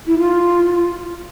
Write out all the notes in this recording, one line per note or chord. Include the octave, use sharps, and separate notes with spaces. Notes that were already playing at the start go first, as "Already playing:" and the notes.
E4
F4